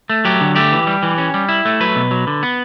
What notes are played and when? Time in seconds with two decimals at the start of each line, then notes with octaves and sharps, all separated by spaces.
0.10 A3
0.25 F#3 G4
0.41 D3
0.56 A3 G4
0.72 E3
0.87 G3
1.03 E3
1.18 C#4
1.34 G3
1.49 E4
1.65 A3
1.80 F#3 B4
1.96 B2
2.11 F#3
2.27 D3
2.43 B3